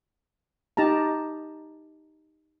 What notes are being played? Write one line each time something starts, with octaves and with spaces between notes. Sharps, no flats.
D#4 G4 A5 A#5